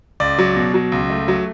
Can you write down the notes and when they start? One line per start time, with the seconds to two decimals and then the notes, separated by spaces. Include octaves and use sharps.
0.20 C#2 D5
0.38 F#3
0.56 B2
0.74 F#3
0.92 C#2
1.10 A3
1.28 F#3